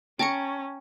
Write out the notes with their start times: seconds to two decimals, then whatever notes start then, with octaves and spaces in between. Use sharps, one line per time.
0.19 C#4 G5 A5 A#5 C#6 C#7